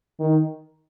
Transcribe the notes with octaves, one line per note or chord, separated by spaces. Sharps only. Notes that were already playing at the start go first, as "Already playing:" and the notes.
D#3